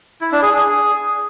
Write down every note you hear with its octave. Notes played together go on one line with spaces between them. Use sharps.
E4
D4
G#4
G#4